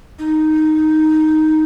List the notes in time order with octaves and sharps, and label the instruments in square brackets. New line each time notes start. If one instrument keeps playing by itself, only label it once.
[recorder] D#4